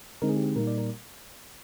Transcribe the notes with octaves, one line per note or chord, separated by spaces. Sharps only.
D3 G#3 C4 D#4 A#4
G#4
G4
G#4
A#2 G3 A#3 D#4 A#4
D5
A#4